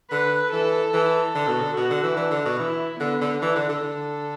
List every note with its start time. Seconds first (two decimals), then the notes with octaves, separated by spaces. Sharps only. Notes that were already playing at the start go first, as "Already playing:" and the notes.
0.11 D3 B4
0.52 E3 A4
0.93 E3 A4
1.35 D3
1.47 B2
1.60 D3
1.76 B2 F#4
1.90 D3
2.03 E3
2.17 E3 D4
2.31 D3
2.45 B2
2.59 E3 E4
3.00 D3 B3
3.21 D3
3.42 E3 D4
3.56 D3
3.69 D3
3.83 D3 A4